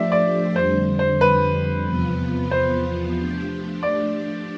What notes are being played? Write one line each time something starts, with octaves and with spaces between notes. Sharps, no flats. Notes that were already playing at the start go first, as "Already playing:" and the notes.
Already playing: F3 A3 D4 G4 C5 D5 E5
D5
F2 D3 G3 C5
C5
B4
E2 C3 F3 B3 F4
C5
F3 A3 D4 G4
D5